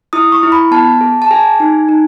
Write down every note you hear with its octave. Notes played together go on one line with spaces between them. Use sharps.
E4 D#6
C#6
E4
B5
B3 A5
G#4
A5
G#4 G#5
D#4
D#4